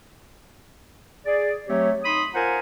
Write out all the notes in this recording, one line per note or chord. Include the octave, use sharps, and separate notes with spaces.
G#4 D5
F#3 A3 C4 G4 C#5
D#4 B5 C6 D#6
F4 A#4 C5 F#5 G#5 A#5